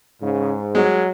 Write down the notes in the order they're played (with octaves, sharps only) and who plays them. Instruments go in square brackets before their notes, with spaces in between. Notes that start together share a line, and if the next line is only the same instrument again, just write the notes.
[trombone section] G#2 [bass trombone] C#3
[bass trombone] F#3 [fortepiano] G#3